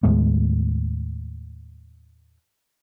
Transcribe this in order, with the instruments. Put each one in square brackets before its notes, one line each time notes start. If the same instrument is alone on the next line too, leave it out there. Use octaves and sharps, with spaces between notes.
[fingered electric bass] D#2 A2 G#3 B3